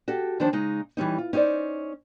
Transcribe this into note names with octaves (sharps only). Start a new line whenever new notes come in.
F#4 G4 A4 G5
D#3 F3 G3 C#4 D4 C5
C#3 G#3 D#4
E3 G3 C#4 D#4
F4
C#4 D#4 F#4 C5 D5